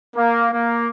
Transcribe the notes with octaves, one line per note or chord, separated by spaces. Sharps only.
A#3
A#3